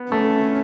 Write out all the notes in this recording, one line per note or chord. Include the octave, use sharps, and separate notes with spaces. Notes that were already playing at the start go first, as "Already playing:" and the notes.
Already playing: B3
A3 C#4